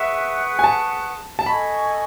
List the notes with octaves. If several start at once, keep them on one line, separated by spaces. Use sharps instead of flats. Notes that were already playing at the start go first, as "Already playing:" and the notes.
Already playing: G#4 B4 E5 F#5 C#6
G#5
A5
A5
A4 D#5 G#5 B5 C#6